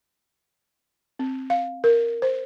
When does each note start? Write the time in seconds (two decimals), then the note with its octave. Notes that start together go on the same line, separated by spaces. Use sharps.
1.19 C4
1.50 F5
1.84 A#4
2.22 C5